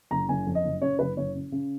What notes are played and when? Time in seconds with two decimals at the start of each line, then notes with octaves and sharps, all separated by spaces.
0.11 F#1 A#5
0.29 F#1 G#5
0.47 F2
0.55 D#5
0.64 F#1
0.82 C#3 C#5
0.99 F#1 B4
1.17 F#1 C#5
1.35 C#3
1.52 C#3